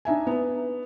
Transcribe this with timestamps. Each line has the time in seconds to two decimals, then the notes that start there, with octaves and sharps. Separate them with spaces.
0.05 D4 D#4 E5 G#5
0.27 B3